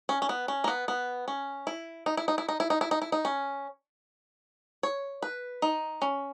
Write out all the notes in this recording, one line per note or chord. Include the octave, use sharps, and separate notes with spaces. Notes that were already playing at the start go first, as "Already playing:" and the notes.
C#4
C#4
B3
C#4
A#3
B3
B3
C#4
E4
D#4
E4
D#4
E4
D#4
E4
D#4
E4
D#4
E4
D#4
C#4
C#5
B4
D#4
C#4